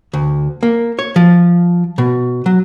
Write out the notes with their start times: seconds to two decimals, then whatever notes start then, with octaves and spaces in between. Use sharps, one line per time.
0.14 D2
0.63 A#3
0.99 C#5
1.16 F3
1.98 B2
2.46 F#3